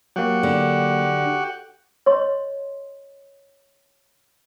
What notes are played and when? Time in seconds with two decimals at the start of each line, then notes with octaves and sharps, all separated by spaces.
0.16 F#3 A#3 F#4 G4 F#5
0.43 D3
2.06 C#5 D#5 C6